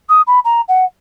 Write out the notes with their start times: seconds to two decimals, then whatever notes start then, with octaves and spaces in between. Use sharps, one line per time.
0.09 D#6
0.27 B5
0.44 A#5
0.68 F#5